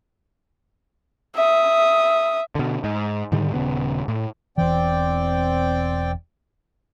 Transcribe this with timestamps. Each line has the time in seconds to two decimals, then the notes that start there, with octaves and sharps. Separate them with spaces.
1.35 E5 D#6
2.55 B2 D3
2.84 G#2
3.32 G#2 D3 D#3 G3
3.54 D#1 C#3 B3
4.08 A2
4.58 E1 E3 C4 D5 G5